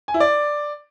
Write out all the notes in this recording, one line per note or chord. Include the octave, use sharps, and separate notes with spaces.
G#5
E4
D5